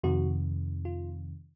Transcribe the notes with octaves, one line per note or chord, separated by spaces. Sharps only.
F2 C3 D#3 F#4
F4